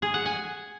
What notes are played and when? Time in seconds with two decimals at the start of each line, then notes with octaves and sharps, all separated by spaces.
0.02 G#4
0.14 F#5
0.26 G#5